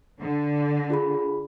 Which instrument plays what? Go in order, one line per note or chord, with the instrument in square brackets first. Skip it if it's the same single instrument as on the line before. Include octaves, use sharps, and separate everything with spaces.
[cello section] D3
[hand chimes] F4 G#4 B5